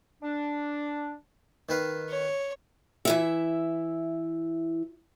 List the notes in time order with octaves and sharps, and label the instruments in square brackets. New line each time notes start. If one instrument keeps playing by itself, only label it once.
[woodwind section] D4
[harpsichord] D#3 B4 F5
[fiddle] C#5
[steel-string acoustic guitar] E3 E4 E5